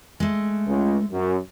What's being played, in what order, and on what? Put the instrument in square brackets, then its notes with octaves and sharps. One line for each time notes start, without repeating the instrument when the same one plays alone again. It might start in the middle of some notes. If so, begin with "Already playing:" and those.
[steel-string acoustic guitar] G#3 A3
[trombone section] C#2
F#2